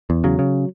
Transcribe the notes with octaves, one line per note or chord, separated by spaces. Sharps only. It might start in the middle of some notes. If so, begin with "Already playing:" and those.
E2
C#3 F#3
C#3